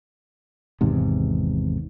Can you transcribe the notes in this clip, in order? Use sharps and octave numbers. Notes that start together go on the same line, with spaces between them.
G#1 E2 G#2 C3